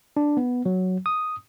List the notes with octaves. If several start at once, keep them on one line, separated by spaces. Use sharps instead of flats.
D4
B3
F#3
D#6